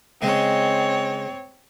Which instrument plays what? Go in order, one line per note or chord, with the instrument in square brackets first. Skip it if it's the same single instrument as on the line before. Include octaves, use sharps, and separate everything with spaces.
[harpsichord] C#3 G#3 [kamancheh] C4 C#5